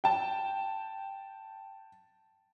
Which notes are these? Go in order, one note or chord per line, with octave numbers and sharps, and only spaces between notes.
G5 A5